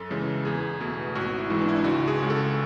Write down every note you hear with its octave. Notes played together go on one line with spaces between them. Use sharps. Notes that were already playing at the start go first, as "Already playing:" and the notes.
Already playing: F#2 A4
C#3 E3 G#3
E2 G#4
B2 A3
G#1 F#4
E4
G#2 E3 G#3
D4
E4
D4
C#2 F#4
G#4
C#3 G#3
A4